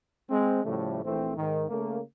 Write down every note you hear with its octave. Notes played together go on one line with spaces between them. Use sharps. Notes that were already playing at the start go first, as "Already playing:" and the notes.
G#3 C4
A2 C#3 F3 G3 A3
A#1 E3 A3 C4
G#2 D#3
C#3 A3 A#3